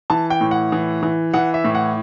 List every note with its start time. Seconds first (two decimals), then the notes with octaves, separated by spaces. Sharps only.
0.10 E3 A5
0.30 G5
0.41 A2
0.51 F#5
0.72 E3
1.03 E3
1.34 E3 F#5
1.54 E5
1.64 A2
1.75 F#5